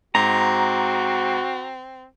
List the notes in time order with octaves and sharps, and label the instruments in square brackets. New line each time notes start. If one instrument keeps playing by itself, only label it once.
[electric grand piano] G#2 [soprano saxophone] C4 [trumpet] F#4 [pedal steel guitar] A#5